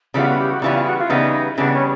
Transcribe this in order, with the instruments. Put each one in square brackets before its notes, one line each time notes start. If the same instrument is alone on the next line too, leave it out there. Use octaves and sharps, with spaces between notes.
[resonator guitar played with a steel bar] C#3 E3 G3 B3 [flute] F4
[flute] F#4
G4
F#4
[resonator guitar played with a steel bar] C#3 E3 G3 B3 [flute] F4
[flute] F4
F#4
F4
[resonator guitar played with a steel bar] C#3 E3 G3 B3 [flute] D#4
[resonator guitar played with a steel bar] C#3 E3 G3 B3 [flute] D4
[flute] C#4